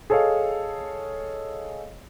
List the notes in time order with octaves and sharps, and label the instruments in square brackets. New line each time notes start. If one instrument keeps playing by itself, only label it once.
[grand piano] G#4 A4 C#5 D#5 F5